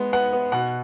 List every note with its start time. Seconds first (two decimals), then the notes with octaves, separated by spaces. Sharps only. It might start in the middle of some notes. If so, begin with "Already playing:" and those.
Already playing: G#3 B3
0.13 B3 F#5
0.33 B3
0.52 B2 F#5